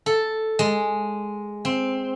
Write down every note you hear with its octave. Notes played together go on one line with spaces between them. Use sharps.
A4
G#3
C4